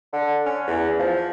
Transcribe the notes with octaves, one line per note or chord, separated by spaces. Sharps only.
D3
C#4
E2
F3